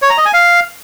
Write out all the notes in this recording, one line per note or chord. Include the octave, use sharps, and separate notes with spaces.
C#5
A#5
D#5
G#5
F5